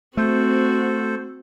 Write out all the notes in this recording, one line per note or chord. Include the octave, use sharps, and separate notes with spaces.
A3 C4 F#4 A4 C5